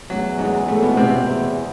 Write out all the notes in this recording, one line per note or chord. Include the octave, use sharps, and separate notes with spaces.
E2 F#3
G#2 G#3
A2 A3
B2 B3
C3 C4
E2